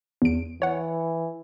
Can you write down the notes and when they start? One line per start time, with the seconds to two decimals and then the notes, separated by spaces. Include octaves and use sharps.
0.22 E2 D7
0.62 E3 C#5 F#5